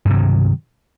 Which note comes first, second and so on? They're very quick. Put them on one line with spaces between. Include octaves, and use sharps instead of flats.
G2 C3 F#3 D#3